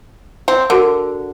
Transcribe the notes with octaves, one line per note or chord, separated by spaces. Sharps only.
C4
D3 F#4 A#4